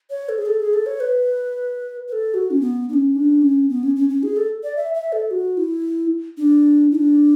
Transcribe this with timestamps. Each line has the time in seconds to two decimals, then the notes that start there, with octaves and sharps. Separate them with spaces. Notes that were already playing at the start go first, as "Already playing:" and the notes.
0.10 C#5
0.29 A4
0.38 G#4
0.46 A4
0.60 G#4
0.74 A4
0.86 C#5
1.00 B4
2.08 B4
2.12 A4
2.34 F#4
2.51 C#4
2.61 B3
2.89 D4
2.94 C#4
3.16 D4
3.42 C#4
3.70 B3
3.83 C#4
3.96 C#4
4.09 C#4
4.23 G#4
4.37 A4
4.63 D5
4.77 E5
4.94 E5
5.12 A4
5.31 F#4
5.57 E4
6.37 D4
6.91 E4
6.95 D4